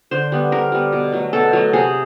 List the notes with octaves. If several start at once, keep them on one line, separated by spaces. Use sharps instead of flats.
D3 C5
G3 B3
D3 A#4
G3 B3
B2
F#3 A3
B2 A4
F#3 A3
C3 G#4